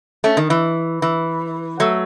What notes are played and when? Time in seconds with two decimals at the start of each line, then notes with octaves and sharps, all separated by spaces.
0.24 A3 C#4
0.37 D#3
0.50 E3
1.02 E3
1.80 F#3 A3